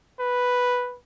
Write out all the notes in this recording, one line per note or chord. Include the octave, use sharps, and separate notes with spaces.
B4